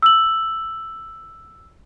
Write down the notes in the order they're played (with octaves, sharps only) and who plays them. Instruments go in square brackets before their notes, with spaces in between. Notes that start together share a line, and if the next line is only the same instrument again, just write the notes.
[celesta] E6 F#7